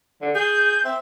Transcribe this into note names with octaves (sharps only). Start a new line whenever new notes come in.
D3
G#4 G6
C4 E5